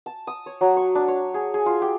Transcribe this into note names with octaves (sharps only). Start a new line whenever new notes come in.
A5
D#6
C#5
F#3
C#6
D4
C#5
G#4
G#4
F4
G4